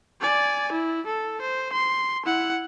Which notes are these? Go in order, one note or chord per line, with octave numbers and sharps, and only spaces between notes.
D5 G#5
E4
A4
C5
C6
E4 F#5